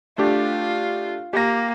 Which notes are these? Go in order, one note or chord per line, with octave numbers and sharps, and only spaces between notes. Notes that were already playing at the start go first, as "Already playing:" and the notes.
A3 D4 F4 G4
A#3 G4 A#6